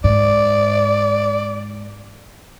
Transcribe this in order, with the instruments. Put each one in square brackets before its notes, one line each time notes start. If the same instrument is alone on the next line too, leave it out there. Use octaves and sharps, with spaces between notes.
[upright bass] G#2 [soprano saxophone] D5